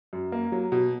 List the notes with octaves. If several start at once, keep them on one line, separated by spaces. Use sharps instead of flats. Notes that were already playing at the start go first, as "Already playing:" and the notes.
F#2
A#3
F#3
B2